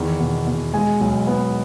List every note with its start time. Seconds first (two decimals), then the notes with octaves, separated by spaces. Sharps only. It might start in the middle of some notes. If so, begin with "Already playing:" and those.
Already playing: E2 D#3
0.19 B2
0.47 B2
0.74 G#3 G#5
1.01 B1
1.27 B3